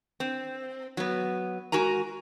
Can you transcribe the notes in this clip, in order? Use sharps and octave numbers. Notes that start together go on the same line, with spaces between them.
C4
F#3 B3
G#2 F#4 A#4 G#5 A#5